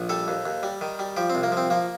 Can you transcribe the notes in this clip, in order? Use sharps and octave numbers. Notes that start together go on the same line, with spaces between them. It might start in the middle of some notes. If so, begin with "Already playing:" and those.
Already playing: A#1
G3 A4
D#2
D#2
G3
D#3
G3
F3 G4
C4
C2
A#3
F3 C4
F3 A#3